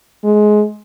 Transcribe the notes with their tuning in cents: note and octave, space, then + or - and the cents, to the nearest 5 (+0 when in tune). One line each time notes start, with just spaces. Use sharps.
G#3 +20